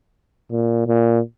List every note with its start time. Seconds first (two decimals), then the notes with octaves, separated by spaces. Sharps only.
0.51 A#2
0.87 A#2